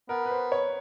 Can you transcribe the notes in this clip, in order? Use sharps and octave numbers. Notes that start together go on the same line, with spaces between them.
B3 A#4
B4
C5
C#5